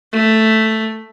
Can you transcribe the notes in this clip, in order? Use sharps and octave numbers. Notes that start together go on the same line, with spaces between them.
A3